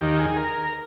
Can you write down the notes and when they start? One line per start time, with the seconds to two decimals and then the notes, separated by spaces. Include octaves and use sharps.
0.01 D#2 D#3 G4
0.19 G#4
0.36 A#4